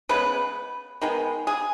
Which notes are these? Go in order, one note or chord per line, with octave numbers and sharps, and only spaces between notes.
C#3 G#3 B3 B4
D#3 G#3 B3
G#4